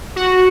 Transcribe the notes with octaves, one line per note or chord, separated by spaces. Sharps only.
F#4